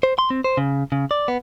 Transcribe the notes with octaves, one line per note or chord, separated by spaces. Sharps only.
C5
C6
C4
C5
C#3
C#3
D5
B3